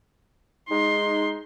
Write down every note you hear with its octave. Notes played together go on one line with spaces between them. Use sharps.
G#3 D#4 C6